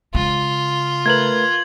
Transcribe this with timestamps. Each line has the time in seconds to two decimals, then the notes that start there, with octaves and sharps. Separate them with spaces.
0.15 C#3 G#3 F4
1.06 A3 A#4 B4 G#6 F#7